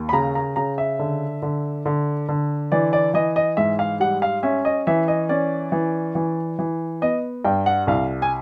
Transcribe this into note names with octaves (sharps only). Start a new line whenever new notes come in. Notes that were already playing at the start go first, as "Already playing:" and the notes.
Already playing: D#2
B5
C#3 A#5
A#5
C#3 A#5
E5
D3
D3
D3
D3
E3 D5
D5
E3 D#5
D#5
G#2 E5
F5
G3 F#5
F5
C#4 E5
D#5
E3 E5
D#5
C#4 D5
E3
E3
E3
B3 D#5
G2 G5
F#5
C2 F5
G#5